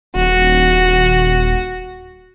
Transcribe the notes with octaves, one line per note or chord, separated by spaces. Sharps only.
D#1 F#4